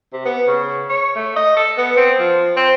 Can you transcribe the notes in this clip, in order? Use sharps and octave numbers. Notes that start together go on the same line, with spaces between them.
C3
B3
C#3
C#5
A3
D#5
A4
B3
C4
F3
C4